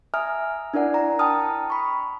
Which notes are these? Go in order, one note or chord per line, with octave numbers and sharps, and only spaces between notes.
E5 G#5 A#5 D#6 F6
D4 E4 A#4 D5 F#5 G#5
F#5 A#5
G5 A5 A#5 D#6 F6
B5 C#6